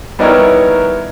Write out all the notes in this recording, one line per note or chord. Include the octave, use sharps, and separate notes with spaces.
G3 B3 D#4 E4 A#4 C#5